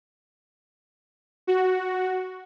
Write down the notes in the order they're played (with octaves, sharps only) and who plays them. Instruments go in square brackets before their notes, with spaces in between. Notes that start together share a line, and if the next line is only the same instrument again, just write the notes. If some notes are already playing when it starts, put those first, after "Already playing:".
[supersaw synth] F#4